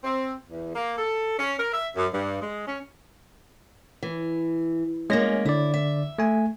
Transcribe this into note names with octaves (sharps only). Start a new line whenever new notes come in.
C4
E2
A#3
A4
C#4
A#4
E5
F#2
G2
G#3
C#4
E3
G#3 A#3 C#4 G#4 A#6
D3 E4 D5
E5
A3 G#5